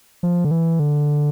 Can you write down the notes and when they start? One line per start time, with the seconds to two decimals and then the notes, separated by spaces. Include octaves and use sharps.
0.23 F3
0.44 D3
0.51 E3
0.79 D3